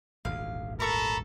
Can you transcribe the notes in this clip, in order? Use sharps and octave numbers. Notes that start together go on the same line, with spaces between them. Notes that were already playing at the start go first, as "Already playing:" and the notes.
D#1 G#1 D2 F5
A4 A#4 A#5 B5 C#6